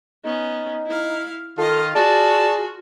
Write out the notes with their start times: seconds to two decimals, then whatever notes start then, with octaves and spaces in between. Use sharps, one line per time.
0.24 B3 C#4 D#4
0.86 E4 F5
1.58 D#3 F4 A4 D#5 F5
1.95 F4 F#4 G#4 D5 A5